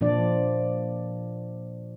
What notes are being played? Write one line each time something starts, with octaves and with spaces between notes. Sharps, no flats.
A#2 F3 D4 D5